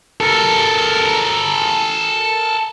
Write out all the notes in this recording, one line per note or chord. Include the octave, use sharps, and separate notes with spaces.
A4 A#4